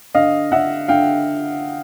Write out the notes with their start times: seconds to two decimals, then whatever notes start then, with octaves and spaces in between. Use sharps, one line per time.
0.14 D3 D#5 F5
0.51 D3 E5 F#5
0.88 D3 F5 G5